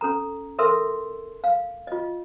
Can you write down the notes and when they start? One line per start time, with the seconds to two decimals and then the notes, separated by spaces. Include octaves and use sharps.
0.01 C#4 A4 A#5
0.59 A4 A#4 E5 C6 E6
1.44 F5
1.87 F4 D#5